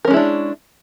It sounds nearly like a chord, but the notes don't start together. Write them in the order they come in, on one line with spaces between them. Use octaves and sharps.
A#4 C#4 G#3 E4 D4